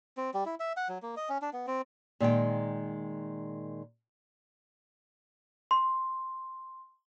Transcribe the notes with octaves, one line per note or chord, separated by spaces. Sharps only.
C4
G3
E4
E5
F#5
F#3
A#3
D#5
C#4
D4
B3
C4
A#2 D#3 G#3 G5
C6